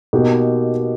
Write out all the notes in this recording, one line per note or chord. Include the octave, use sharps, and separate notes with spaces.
B2 A#3 D#4 G4